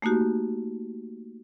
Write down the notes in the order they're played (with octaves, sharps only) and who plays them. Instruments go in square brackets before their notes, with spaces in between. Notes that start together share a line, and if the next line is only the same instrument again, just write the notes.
[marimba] A3 A#3 D#4 F#4 G4